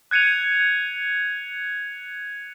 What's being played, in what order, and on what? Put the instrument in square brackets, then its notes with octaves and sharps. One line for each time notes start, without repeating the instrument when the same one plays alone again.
[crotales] F#6 G#6 C#7 D#7 F7